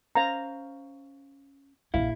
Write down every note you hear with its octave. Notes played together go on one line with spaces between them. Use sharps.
C#4 C5 F5 A#5
A#1 F#2 E4 F5